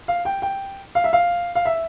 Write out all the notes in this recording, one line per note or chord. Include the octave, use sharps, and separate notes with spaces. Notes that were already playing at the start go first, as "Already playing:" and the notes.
F5
G5
G5
F5
E5
F5
F5
E5